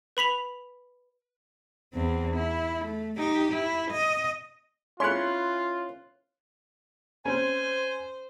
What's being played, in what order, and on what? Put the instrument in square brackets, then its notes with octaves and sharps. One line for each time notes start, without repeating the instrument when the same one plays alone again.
[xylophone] B4 B5 B6 F7
[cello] E2 C4
E4
A3
D#4 G4
E4
D#5
[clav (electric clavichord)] C#4 E4 C#5 [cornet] F4 [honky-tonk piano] C6 F#6
[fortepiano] C4 C#4 [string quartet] C5 [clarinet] G#5